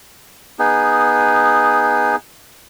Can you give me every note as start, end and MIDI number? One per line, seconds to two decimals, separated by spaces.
0.59 2.16 59
0.59 2.16 63
0.59 2.16 68